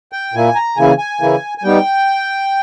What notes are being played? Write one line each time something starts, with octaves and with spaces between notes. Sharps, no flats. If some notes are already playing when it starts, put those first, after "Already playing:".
G5
A#2 A#3 E4 G#5
A#5
C#3 E3 A#3 E4 G#5
G#5
C#3 E3 A#3 E4
G#5
G3 B3 D#4 G5